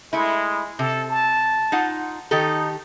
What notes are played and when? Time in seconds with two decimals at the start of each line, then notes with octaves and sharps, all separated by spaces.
0.13 G#3 A3 E4
0.79 C3 A4
1.10 A5
1.72 D#4 F4 F#5
2.31 D#3 D#4 G4 A4